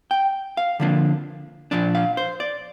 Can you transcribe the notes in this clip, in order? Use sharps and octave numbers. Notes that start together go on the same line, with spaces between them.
G5
F5
D3 F3 A#3 D4
A#2 F3 D4 D5
F5
C5
D5